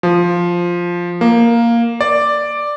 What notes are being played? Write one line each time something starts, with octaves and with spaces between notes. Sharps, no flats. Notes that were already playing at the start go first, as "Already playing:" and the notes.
F3
A#3
D5